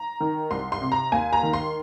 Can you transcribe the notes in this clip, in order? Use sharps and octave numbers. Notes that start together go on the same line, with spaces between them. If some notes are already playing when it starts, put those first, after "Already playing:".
Already playing: A#5
D#3
C2 C6
C6
C3
A#5
D#2 G#5
A#5
D#3
C6